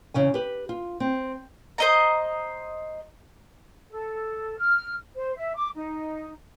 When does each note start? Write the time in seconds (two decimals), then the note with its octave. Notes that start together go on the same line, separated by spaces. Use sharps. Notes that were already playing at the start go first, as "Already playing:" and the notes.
0.14 E2 C#3 C#4 G#5
0.34 G4 B4
0.69 F4
1.00 C4
1.78 C5 D#5 A#5
3.91 A4
4.57 F6
5.15 C5
5.36 E5
5.55 D6
5.75 D#4